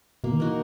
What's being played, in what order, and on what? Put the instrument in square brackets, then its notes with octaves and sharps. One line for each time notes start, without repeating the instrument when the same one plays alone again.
[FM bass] B2 [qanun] A#3
[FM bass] D#3
[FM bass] E3 [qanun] D#4 F#4 A#4